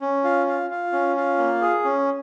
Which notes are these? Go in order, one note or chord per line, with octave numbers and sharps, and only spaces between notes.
C#4
F4
F4
F4
C#4
F4
A#3
G#4
C#4